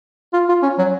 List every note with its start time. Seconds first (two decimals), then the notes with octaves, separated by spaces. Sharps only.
0.33 F4
0.49 F4
0.62 C#4
0.78 F#3